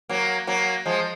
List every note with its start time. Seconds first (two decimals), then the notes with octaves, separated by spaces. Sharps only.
0.09 F#3 A#3
0.47 F#3 A#3
0.86 F3 G#3